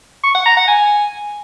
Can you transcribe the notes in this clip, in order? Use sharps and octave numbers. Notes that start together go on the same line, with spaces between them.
C#6
F#5
A#5
F#5
G#5